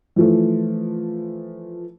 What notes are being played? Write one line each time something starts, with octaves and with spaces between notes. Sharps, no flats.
E3 F3 A3